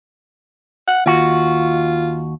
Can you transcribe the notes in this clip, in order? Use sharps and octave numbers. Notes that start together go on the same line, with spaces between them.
F#5
D#2 F4 F#4